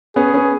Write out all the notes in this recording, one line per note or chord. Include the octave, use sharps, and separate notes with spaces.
B3 C#4 G#4
B3 C#4